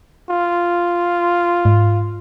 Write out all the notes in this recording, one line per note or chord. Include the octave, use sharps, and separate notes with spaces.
F4
G#2